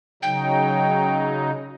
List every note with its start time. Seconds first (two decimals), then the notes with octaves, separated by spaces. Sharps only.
0.23 C#3 F#3 D#4 G5